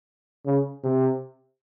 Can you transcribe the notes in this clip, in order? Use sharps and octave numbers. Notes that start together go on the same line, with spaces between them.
C#3
C3